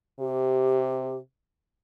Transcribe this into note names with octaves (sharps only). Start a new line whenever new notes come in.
C3 G4